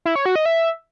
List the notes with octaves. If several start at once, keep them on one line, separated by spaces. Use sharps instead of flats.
E4
C#5
F#4
D#5
E5